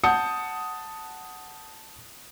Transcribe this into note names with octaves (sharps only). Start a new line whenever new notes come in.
F#5 A5 D#6 G6 C#7